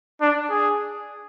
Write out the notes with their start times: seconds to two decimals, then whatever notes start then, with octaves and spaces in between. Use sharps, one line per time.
0.21 D4
0.51 G#4